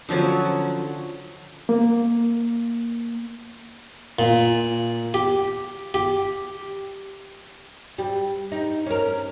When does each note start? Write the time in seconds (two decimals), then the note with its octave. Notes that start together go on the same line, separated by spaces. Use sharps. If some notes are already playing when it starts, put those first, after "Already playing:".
0.09 D3 F3 F#3 C#4
1.69 A#3
4.19 A#2
5.14 G4
5.94 G4
7.98 G3
8.52 D#4
8.86 C#4 A#4